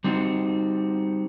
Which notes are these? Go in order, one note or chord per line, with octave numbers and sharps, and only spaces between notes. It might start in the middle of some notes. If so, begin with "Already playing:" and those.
G3 C4 D#4 F#4